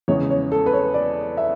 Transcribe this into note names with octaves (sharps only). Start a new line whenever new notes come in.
E2 C#3 G#3 C#5
C#5
A4
B4
C#5
D5
E5